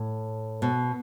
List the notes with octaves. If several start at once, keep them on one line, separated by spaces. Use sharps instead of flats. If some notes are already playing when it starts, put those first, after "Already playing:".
Already playing: A2
B2